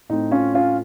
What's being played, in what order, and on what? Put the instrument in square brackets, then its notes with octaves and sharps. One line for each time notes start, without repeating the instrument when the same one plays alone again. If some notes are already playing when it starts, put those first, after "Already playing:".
[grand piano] A2 A3 C4 D#4
C#4 F4
C#4 F4